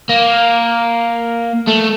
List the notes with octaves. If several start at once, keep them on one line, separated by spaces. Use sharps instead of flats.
A#3
A3